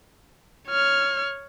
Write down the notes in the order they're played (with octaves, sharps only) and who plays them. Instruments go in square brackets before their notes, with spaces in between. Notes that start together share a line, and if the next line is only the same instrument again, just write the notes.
[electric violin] C#5 F6